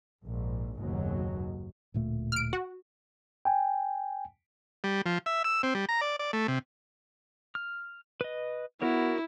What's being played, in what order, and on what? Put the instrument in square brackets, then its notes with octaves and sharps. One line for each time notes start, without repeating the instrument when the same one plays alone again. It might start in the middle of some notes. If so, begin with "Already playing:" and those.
[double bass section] A#1 G#2
F#1 D#2 G#2 B2 F#3
[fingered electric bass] D1 A#2 A3
[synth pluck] F6 D7
F#4
[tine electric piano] G5 G#5
[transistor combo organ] G3
F3
E5
E6
C4
G3
A#5
D5
D5
A3
C3
[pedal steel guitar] F6
B4 D#5
[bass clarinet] B3 [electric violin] E4 [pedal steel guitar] F#4 A#4 C#5